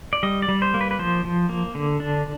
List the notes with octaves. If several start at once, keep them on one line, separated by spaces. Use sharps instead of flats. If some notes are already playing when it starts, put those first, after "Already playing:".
D5
G3 D#5
D5
G3
C5
A#3
B4
B4
F3 C5
F3
A#3
D3
D4